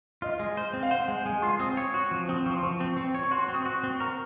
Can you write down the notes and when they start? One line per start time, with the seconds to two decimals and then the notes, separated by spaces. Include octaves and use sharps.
0.22 F4 D#5
0.39 G#3
0.57 C5
0.73 C4
0.83 F5
0.91 C5 F#5
1.08 G#3
1.26 G#3 G#5
1.42 F4 C6
1.59 C4 D#6
1.77 C#5
1.94 F#4 C#6
2.11 F3
2.29 C4 D#6
2.46 F3 C#6
2.55 C6
2.63 F3 C#6
2.80 C4
2.97 C4 C#6
3.15 C#5
3.23 C#6
3.31 F#4 C6
3.49 C4
3.54 D#6
3.65 F#4 C#6
3.84 C4
4.00 A#4 C#6